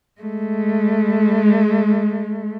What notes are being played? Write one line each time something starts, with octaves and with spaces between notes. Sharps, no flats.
G#3 A3